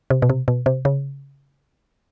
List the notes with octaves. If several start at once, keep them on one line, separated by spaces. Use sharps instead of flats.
C3
B2
C3
B2
C3
C#3